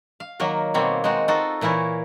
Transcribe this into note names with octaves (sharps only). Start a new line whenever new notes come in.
F5
D#3 F#3 A#3 A#4
B2 G3 A#3 C4 C#5
G#3 C4 D#4 F#4
D#4 F4 F#4 A4
A#2 E3 E4 A#4 C#5